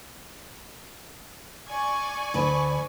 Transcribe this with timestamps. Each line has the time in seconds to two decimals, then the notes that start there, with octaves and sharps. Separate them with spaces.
1.68 D5 G#5 C#6
2.34 D2 B4